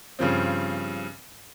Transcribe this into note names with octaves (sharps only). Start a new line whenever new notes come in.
G2 C#3 F3 C4